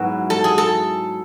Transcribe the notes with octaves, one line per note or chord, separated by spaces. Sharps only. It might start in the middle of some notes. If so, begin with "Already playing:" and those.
Already playing: G#2 F#3 B3 E4 F#4
A4
G#4
A4